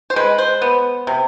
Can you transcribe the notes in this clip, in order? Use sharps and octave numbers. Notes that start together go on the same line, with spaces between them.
C5
G#3 B4
C5
B3
C3